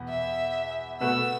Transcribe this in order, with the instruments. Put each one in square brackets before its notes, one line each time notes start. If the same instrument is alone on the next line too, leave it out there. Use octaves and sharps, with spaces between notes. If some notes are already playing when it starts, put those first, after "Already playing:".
Already playing: [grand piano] E2 B2 B3
[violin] E5
[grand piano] B2 A3 F#4 B4 [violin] E6